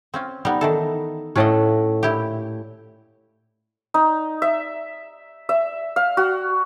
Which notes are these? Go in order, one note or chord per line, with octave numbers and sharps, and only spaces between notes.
C4 C#4 F4
G3 B3 D#4
D#3 E3 A4
A2 A3 C#4 D5 D#5 F#5
A#2 E4 G4
D#4
E5
E5
F5
F#4